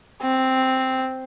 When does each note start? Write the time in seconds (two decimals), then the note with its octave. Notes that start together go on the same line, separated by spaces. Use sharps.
0.23 C4